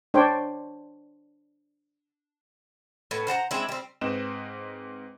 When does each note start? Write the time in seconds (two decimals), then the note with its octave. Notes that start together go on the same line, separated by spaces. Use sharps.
0.14 D4 C5 C#5 G5
3.11 A2 B3
3.27 C5 F#5 A5 A#5
3.51 G#3 C4 D4 E4
3.69 G3 C4
4.01 G#2 C4 B4 D#5 E7